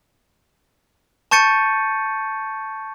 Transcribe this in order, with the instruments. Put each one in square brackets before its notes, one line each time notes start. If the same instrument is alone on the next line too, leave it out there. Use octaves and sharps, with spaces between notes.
[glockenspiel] A5 C#6 G6 A6 C#7 D#7